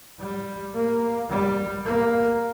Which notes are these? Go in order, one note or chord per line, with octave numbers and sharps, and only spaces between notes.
G3
A#3
G3
A#3